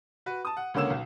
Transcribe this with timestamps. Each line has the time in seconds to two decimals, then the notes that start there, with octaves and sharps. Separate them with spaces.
0.26 F#4 B4
0.45 A5 D#6
0.57 F#5
0.74 C#2 D3 A#3 C#4 E6 E7
0.90 B1